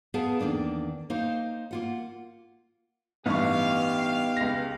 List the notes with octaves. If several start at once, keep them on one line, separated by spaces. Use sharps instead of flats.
B3 G#4 A#4 F5 G5 A5
E2 D#3 A#3 D4 A4
A#3 D#4 C5 F5
A#3 F4 F#5
A1 G2 B3 D#4 G4 F5 C#6
C#2 A#6